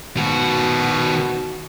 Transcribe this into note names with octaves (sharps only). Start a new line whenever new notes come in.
B2 D#3 F#4